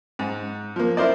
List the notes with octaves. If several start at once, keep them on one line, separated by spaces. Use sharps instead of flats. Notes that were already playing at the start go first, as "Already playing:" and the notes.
G#2
F3 A#3
E4 A#4 C5 D5